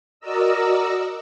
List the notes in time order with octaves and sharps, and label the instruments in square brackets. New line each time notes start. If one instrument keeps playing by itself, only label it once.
[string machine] F#4 A#4 D5 D#5 A#5 E6